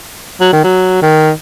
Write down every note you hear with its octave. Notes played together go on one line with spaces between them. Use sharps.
F#3
D#3
F#3
D#3